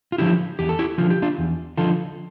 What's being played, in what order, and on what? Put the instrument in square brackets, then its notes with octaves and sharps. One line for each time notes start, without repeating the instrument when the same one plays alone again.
[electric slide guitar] F4
D3 F3 E4 G4
E2 G4
A4
E4 G4
D3 F3 F4
G4
D4 F4
E2
D3 F3 F4 A4